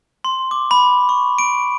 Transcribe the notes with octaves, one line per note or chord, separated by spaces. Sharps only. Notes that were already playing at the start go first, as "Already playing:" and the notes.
C6
D6
B5
C#6
D7